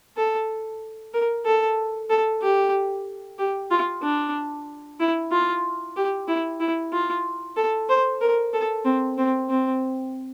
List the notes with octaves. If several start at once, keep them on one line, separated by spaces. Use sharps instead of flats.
A4
A#4
A4
A4
G4
G4
F4
D4
E4
F4
G4
E4
E4
F4
A4
C5
A#4
A4
C4
C4
C4